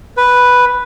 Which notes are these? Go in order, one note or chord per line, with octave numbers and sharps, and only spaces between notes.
B4